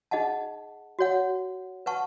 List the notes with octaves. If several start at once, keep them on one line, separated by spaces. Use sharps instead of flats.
D#4 G#4 D#5 F#5 A5
F#4 C#5 F#5
B4 F#5 A5 C#6